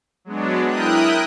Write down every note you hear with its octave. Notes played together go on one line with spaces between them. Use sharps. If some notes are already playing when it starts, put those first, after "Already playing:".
F#3 G#3 B3 D4
E4 A#4 G5 D#6 F#6